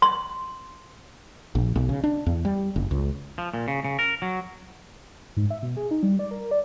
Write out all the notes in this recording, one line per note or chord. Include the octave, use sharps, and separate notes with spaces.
C6
A#1
B1
C#3
D4
E2
G3
F#1
C#2
F3
A#2
C#3
C#3
A#4
F#3
G#2
E5
B2
G#4
D#4
G3
D5
A#4
D5